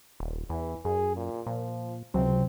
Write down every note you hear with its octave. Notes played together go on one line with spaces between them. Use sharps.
D#1
E2 E3
F#2 G#4
A#2
A#2 F3
C#2 C3 F#3 C4